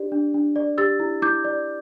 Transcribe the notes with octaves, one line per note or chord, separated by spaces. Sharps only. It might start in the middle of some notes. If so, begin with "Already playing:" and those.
Already playing: D4 G4 D5
D4
D4
D5
G4 E6 A6
E4
E4 D6 G6
D5